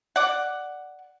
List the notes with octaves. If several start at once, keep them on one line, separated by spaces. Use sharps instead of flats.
D5 F#5